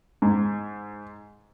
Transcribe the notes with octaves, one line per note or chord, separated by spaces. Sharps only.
G#2